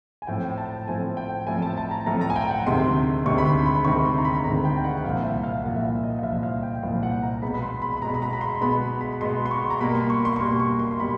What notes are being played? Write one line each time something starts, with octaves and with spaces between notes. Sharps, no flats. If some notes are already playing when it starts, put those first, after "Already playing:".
G#5
A2 F3 A3 C4 G5
A5
A2 F3 A3 C4 G#5
G5
A2 F3 A3 C4 G#5
A5
A5
A#5
A2 F3 A3 C4 A#5
A#5
G#5
G5
F#5
D2 C3 D#3 G#3 C6
D2 C3 D#3 G#3 C#6
B5
C6
B5
D2 C3 D#3 G#3 C#6
C6
A#5
B5
D2 C3 D#3 G#3 A#5
G5
F#5
F#5
C2 A#2 F3 F5
E5
F5
C2 A#2 F3 F#5
E5
F5
D#5
F5
C2 A#2 F3 E5
F5
G5
C2 A#2 F3 F5
F#5
A#5
B2 G#3 B3 B5
B5
C6
B5
B5
B2 G#3 B3 A#5
B5
A#5
B5
C6
B2 G#3 B3 B5
B5
B2 G#3 B3 C6
C6
C#6
A#5
B2 G3 A#3 B5
C6
C#6
C6
C#6
B2 G3 A#3 C6
C#6
C6
C6
B2 G3 B5